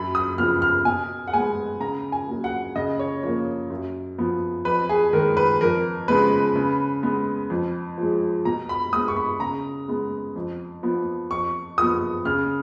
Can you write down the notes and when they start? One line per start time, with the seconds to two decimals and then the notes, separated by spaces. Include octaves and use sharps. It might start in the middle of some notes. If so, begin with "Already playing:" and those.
Already playing: F#2 B5
0.15 D#6
0.38 C#3 F3 B3 F6
0.62 F6
0.85 B2 G#5
1.28 F#5
1.33 G#3 B3 G#5
1.81 C#3 A#5
2.12 G#5
2.28 F#3 A#3
2.44 F#5
2.76 C#3 D#5
2.99 C#5
3.23 F3 A#3 C#5
3.70 F#2
4.18 F3 B3
4.65 F2 B4
4.89 G#4
5.13 D#3 G#3 A#4
5.37 B4
5.61 F2 A#4
6.08 C#3 G#3 B3 B4
6.56 C#3
7.03 G#3 B3
7.50 F2
7.98 F3 G#3
8.45 B2 A#5
8.69 B5
8.93 G#3 B3 D#6
9.08 C#6
9.17 B5
9.40 C#3 A#5
9.88 G#3 B3
10.36 F2
10.83 F3 B3
11.31 F2 C#6
11.78 F3 B3 D#6
12.25 C#3 F6